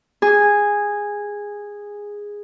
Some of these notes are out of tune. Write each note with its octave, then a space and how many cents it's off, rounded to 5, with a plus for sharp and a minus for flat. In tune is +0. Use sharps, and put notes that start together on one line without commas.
G#4 -10